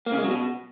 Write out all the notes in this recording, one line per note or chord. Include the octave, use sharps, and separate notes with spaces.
A#3
C#3
G#3
F#3
B2